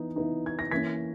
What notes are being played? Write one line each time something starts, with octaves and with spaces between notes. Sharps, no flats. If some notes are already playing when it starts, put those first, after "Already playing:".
Already playing: E3 B3 D#4
E3 B3 D#4
G#6
A#6
E3 A#3 C#4 G#6 B6